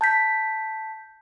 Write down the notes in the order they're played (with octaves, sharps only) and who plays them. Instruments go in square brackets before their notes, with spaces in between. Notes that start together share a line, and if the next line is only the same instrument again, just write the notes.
[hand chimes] A5 G6 B6